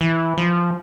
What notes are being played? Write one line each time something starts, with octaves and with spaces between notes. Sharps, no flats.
E3
F3